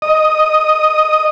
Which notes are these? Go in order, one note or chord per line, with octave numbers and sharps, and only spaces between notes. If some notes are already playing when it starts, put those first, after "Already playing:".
D#5 D#6